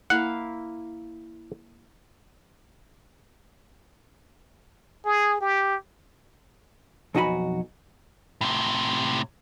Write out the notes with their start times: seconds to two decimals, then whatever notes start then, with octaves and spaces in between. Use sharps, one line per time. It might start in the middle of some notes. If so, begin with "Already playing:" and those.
0.10 A#3 E4 F5 F#5
5.05 G#4
5.41 G4
7.15 B1 F2 D#4 F#4 G#5 B5
8.41 A2 C3